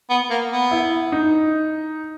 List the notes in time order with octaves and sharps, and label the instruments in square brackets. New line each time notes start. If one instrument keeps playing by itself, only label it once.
[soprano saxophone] B3
A#3
B3
[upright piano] E4
D#4